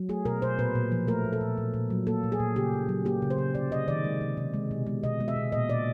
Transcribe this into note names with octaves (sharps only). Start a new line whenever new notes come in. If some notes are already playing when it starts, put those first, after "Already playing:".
Already playing: F#3
A3 G#4
B2 A#4
B2 C5
A#2 B4
A#2
F3
A3 A#4
A#2
A4
A#2
A#2
A#2
F#3
A#3 A4
A#2
G#4
A#2
C#3 G4
C#3
F#3
A#3 G4
C#3
C5
C#3
C3 D5
C3 D#5
D#3 D5
G#3
C3
C3
G#3
B2
G#3
B2 D#5
G#3
E5
B2
A#2 D#5
A#2 D5